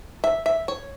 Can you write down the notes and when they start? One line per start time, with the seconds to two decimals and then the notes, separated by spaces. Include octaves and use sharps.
0.24 E5
0.46 E5
0.68 C#5